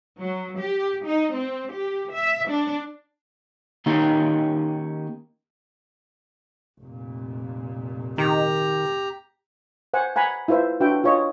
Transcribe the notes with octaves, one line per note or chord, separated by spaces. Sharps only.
F#3
G4
D#4
C4
G4
E5
D4
D#3 A#3 C#4 D#4 G4
F1 A#2
D#3 G4 A#5
C5 F#5 G#5
F#5 G#5 A#5 B5
E4 F4 B4 C5 E5
D4 F#4 B4 E5 G5
F4 C#5 D#5